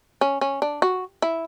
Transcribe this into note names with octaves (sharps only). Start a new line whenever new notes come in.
C#4
C#4
D4
F#4
E4